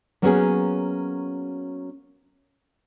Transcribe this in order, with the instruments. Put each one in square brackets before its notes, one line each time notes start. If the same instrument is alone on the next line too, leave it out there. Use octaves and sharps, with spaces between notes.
[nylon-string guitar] F#3 A#3 B3 C#4 F#4 G#4